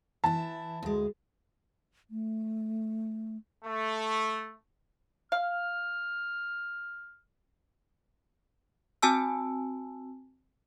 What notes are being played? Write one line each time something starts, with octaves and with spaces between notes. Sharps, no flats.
E3 E4 A5
D2 G#3
A3
A3
F5 F6
C4 F#4 G#5 A5 E6